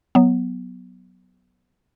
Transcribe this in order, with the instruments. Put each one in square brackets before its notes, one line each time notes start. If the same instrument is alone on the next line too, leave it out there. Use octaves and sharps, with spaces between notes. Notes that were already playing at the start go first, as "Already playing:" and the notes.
[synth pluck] F#3 B3